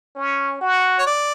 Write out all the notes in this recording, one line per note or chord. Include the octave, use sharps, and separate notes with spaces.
C#4
F#4
C#5
D5